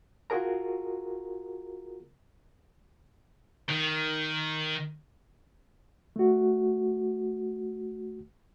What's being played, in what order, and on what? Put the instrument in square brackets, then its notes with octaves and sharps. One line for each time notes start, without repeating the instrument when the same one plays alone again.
[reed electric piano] F4 F#4 G#4 A#4 A#5
[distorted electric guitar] D#3
[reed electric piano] A3 F#4